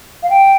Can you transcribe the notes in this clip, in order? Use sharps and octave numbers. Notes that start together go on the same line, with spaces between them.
F5
G5